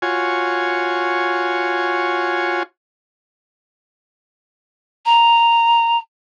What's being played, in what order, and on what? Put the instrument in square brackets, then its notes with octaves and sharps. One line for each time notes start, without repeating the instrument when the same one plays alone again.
[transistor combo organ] F4 F#4 C#5 G#5
[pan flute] A#5